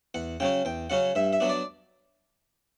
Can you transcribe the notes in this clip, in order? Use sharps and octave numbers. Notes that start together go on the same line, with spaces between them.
E2 F#5
C#3 F#3 C#4 G5
E2 G5
C#3 F#3 C#4 F#5
G2 E5
E5
F#3 B3 D4
D5